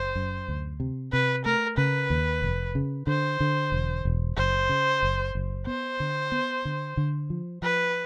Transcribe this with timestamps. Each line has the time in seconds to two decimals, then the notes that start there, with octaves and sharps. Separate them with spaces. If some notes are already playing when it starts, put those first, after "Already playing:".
Already playing: F#1 C5
0.16 F#2
0.48 D2
0.80 C3
1.12 C3 B4
1.45 A3 A#4
1.77 C#3 B4
2.10 D#2
2.42 F1
2.75 C#3
3.07 D3 C5
3.40 D3
3.72 E1
4.05 E1
4.37 F#1 C5
4.69 C#3
5.03 F#1
5.35 F#1
5.67 B3 C5
6.00 D3
6.32 B3
6.65 D3
6.97 D3
7.30 F3
7.62 F3 B4